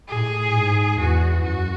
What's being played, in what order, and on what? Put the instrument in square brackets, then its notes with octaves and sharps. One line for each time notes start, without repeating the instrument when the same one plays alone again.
[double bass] A2 [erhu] G#4
[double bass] G#2
[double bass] E2 [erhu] F#4
[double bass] F#2 [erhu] F#4